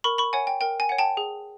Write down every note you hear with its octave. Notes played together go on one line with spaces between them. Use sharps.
A#4 B5 C#6
B5 C#6
C#5 F#5 G#5
G5
A#4 G5
G#5
C#5 F#5
G5 A5
G#4